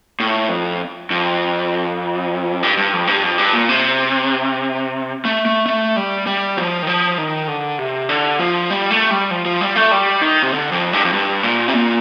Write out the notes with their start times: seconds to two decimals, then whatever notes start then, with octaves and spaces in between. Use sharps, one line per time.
0.20 A2
0.49 F2
1.11 F2
2.63 G2
2.77 G2
2.93 F2
3.07 G2
3.23 F2
3.38 G2
3.53 A#2
3.69 C3
5.25 A3
5.46 A3
5.66 A3
5.96 G3
6.27 G3
6.57 F3
6.82 D#3
6.87 F3
7.18 D#3
7.48 D3
7.78 C3
8.09 D3
8.40 F3
8.70 G3
8.91 A3
9.11 G3
9.31 F3
9.45 F3
9.61 G3
9.76 A3
9.91 G3
10.21 D#3
10.43 C3
10.52 D3
10.72 F2
10.93 G2
11.05 F2
11.13 G2
11.43 A#2
11.68 C3
11.74 A#2